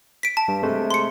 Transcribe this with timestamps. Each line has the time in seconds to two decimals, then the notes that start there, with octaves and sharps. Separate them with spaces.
0.23 B6 D7
0.37 A5
0.48 G2
0.63 C3 G#3 A3
0.91 C6 C#7